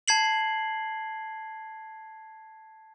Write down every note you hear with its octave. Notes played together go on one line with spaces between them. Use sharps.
A5 G#6 C7 F#7